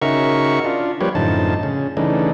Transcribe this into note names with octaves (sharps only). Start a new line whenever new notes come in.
C#3 D#4 F#4 A#4 E5 C#6
D4 F4
F3 G3 A#3 G4 B4 C#5
F#2 A2 D3 F3 D#4 A5
C#3
C#3 E3 A3 D4 D#4